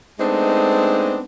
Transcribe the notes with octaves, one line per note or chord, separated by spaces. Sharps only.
G#3 A3 B3 C4 D4 D#4